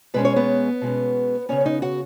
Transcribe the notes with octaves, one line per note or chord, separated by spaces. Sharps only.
B2 G#3 C#4 B4
C#5
B3 B4
B2 G#3 C#4
C#3 B3 C#4 C#5
C#5
D#4 D#5
F#4 F#5